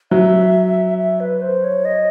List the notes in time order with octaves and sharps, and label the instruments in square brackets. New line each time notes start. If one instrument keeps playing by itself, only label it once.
[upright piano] F#3 [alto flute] E5
[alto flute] E5
B4
C5
C#5
D#5